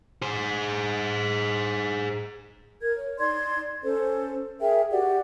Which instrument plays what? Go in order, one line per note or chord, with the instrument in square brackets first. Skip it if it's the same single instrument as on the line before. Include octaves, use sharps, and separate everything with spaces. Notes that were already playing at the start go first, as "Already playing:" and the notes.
[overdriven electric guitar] G#4 C5
[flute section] A#4 G#6
C#5
D#4 D5 C6 G#6
C#4 A4 C5
G#4 A#4 E5 G5
F#4 G4 D5 F#5